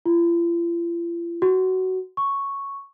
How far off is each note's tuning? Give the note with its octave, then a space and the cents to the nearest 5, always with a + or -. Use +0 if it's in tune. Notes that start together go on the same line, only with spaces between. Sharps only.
F4 -45
F#4 +15
C#6 +0